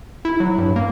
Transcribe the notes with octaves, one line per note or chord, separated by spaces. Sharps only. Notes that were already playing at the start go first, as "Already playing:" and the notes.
E4
F#3
G2
A#3